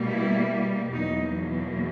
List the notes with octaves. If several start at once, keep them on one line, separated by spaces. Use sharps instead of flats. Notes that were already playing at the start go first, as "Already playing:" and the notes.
Already playing: B2 G3 A#3
E4
E2 B2 F#3 A#3 D#4